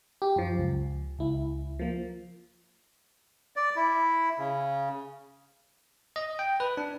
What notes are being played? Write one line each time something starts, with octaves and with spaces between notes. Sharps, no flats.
G4
F#2 F3
C#2
C#2 E4
F3 A#3
D5
E4
C#3
D#5
G5
B4
D4